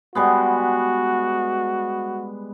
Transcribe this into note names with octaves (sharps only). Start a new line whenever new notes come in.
G3 G#3 B3 F#4